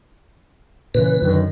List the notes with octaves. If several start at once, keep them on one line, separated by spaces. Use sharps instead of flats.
A#2 C#3 E3 B4
F#2 D3 D#3